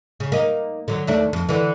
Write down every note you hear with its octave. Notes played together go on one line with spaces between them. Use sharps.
C#3
A#3 D#4
D3 F#3
D#2 A3 D4
F2
D3 E3